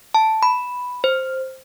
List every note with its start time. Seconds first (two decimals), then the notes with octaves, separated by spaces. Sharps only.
0.14 A5
0.43 B5
1.04 C5